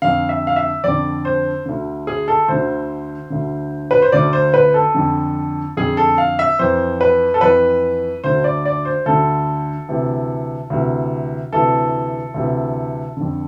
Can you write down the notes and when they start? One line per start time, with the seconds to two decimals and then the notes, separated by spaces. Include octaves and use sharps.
0.02 F2 D3 F5
0.29 E5
0.47 F5
0.56 E5
0.84 F2 D3 D5
1.25 C5
1.66 D2 D3
2.07 G#4
2.28 A4
2.48 D2 D3 C5
3.30 D2 D3
3.91 B4
4.02 C5
4.12 D2 D3 D5
4.33 C5
4.54 B4
4.74 A4
4.94 F2 D3
5.77 F2 D3 G#4
5.97 A4
6.18 F5
6.39 E5
6.59 F2 E3 C5
7.01 B4
7.34 A4
7.41 F2 E3 B4
8.24 D2 D3 C5
8.44 D5
8.66 D5
8.85 C5
9.06 D2 D3 A4
9.89 D2 C3 E3
10.70 D2 C3 E3
11.53 D2 C3 E3 A4
12.34 D2 C3 E3
13.17 F2 D3